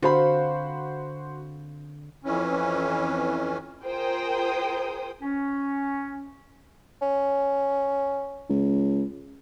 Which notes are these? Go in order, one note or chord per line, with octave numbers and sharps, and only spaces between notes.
D3 C4 F4 F#4 C5 B5
F2 E3 C#4
F4 G#4 A#4 C5 G5 D#6
C#4
C#4
C#2